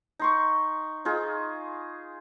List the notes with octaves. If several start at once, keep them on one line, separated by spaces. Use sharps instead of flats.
D#4 C6 C#6
D#4 F4 G#4